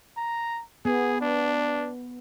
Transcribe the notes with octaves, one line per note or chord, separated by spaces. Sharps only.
A#5
B3 G#4
D4